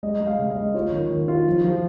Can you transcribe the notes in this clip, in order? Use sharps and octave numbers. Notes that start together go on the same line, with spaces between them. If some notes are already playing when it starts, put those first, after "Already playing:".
G#3 D#5
G#3
F5
C#3
D#5
G#3
F4 C#5
D#3
D#3
F4
F3
F3